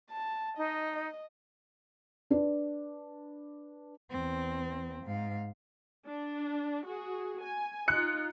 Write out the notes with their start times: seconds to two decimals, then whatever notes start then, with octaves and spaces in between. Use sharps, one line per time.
0.10 A5
0.57 D#4 D#5
0.97 D#5
2.30 D4 B4 D5
4.11 E2 C4
5.04 G#2 F5
6.07 D4
6.86 F#4 G#4
7.42 G#5
7.88 D#4 F4 F#6 C#7